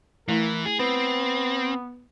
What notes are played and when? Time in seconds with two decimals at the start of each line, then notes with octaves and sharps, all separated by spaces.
0.29 E3 A3 E4 A#4
0.66 G#4
0.79 B3 C4